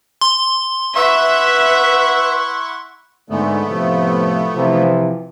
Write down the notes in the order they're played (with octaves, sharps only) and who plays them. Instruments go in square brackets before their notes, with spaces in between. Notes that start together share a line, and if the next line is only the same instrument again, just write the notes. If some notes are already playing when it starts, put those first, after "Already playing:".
[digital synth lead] C6
[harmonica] E4 F#5 C#6 [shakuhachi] B4 [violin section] E5
[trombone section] G#2 D3 [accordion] A3 B3
[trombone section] A2 C3 F3
C3 E3 F3